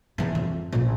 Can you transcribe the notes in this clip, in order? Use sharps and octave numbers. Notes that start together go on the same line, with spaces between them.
E2 E3
F2
A#1 C#3